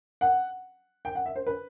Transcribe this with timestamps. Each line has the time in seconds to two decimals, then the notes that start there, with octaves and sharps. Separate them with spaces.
0.21 F#5
1.05 G5
1.15 F#5
1.26 E5
1.36 C5
1.47 B4